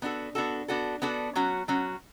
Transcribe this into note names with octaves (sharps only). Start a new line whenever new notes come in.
B3 D4 F#4 A4
B3 D4 F#4 A4
B3 D4 F#4 A4
B3 D4 F#4 A4
F#3 C#4 F#4
F#3 C#4 F#4